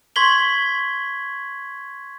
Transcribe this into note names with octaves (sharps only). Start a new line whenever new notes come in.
C6 C#6 G#6 B6 F#7 G7